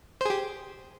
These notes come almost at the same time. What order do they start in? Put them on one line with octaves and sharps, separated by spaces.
C5 G#4 G4